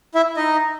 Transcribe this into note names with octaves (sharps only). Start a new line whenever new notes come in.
E4 E5
D#4 D#5